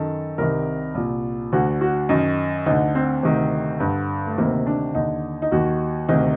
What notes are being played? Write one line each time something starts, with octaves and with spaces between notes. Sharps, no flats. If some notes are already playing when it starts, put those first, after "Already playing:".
Already playing: F#2 D#3 A4
C2 C3 D#3 A#4
C2 A#2
D2 D3 F#4
F#4
F#2 D#3 D#4
D2 D3 D#4
C4
D2 C3 D#3
G2 D3
A3
D2 C3 D#3 A#3
D4
D#2 D3 D#4
D#4
D#2 D#3 F#4
D2 C3 D#3 D#4